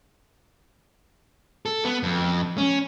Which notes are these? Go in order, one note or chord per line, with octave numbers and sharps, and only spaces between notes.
A4
B3
F2
C#4